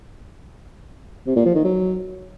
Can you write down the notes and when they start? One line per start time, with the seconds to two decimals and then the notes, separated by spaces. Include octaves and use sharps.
1.26 C3
1.36 A#2
1.45 F3
1.55 D#3
1.64 F#3